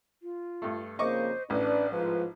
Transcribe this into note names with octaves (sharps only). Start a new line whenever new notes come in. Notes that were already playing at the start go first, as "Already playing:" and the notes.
F4
G2 A3
F2 C#3 A#3 C5 D#5 C#6 D6
A1 C#4 D4 B4 D5
G#2 F3 B4